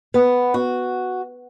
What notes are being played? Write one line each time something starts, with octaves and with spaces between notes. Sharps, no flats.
B3
F#4